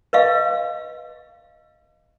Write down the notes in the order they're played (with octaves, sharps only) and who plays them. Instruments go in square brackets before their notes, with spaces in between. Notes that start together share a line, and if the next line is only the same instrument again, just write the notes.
[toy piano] B4 D#5 F5